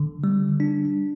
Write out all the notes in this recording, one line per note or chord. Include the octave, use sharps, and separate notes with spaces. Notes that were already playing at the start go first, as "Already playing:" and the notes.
Already playing: D3
G3
D4